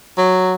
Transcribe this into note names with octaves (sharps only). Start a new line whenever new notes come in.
F#3